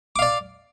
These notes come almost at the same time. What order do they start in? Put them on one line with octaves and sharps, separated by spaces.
D6 F5 D5